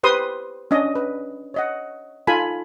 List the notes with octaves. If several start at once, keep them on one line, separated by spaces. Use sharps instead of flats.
G4 B4 C5 C6 D#6
C#4 D4 D#5
B4
C#5 D#5 F#5
D#4 F4 A4 G#5 B5